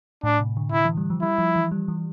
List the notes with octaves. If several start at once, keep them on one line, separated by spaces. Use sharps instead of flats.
A2 D4
C3
D3
D3 E4
E3
G3
F3
G3 E4
F3
E3
G3
E3